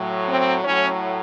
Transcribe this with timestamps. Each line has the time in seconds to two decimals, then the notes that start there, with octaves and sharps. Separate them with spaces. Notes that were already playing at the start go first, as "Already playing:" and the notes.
Already playing: A2 F#3
0.28 C4
0.64 A2 F#3 C#4